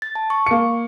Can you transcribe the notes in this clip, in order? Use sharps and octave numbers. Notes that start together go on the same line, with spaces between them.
A6
A5
C#6
A#3 C#7